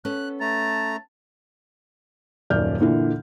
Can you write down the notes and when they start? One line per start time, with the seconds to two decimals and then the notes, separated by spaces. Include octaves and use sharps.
0.05 B3 C#4 A4 F#6
0.41 A3 A5 A#5
2.50 D#1 F#2 D#3 D5 F6 G6
2.81 A#2 D3 E3